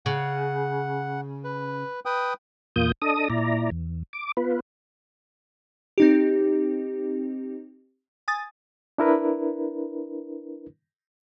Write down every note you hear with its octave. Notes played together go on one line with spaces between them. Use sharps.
C#3 F#5
B4
B4 G5 D#6
E2 A#2 A#3 F4 D#6 G6
D4 A4 D#5 D#6
A#2 E4 D5 A#5
E2
D6
B3 F4 B4
C4 D#4 G4
G#5 D#6 A6
D4 E4 A#4 B4